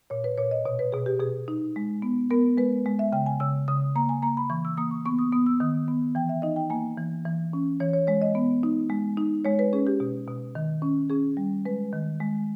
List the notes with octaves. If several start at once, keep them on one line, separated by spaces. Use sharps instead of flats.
A#2 C#5
B4
A#2 C#5
D#5
B2 C#5
B4
B2 G#4
G4
B2 G#4
D#4
G#3
B3
B3 A#4
G#3 B4
G#3
E5
C#3 G5
G#5
C#3 E6
C#3 D#6
A#3 A#5
G#5
A#3 A#5
B5
E3 C#6
E6
A#3 D#6
C#6
B3 C#6
D#6
B3 D#6
E6
D#3 D#6
B3
E3 G5
E5
D#4 D#5
G5
A#3 G#5
E3
E3
C#4
E3 C#5
C#5
G#3 C#5
D#5
B3
D#4
G#3
D#4
G#3 C#5
B4
C#4 G#4
G4
B2
B2
D#3
C#4
C#4 G#4
G3
G#3 B4
D#3
G#3